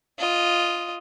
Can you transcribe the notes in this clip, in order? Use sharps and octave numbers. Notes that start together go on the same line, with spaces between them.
F4 D#5